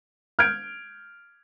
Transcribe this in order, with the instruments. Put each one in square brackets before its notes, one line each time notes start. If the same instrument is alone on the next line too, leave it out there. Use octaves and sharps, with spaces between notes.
[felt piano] F6 G6 G#6 D7